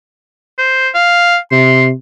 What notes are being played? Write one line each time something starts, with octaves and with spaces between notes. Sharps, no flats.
C5
F5
C3 C6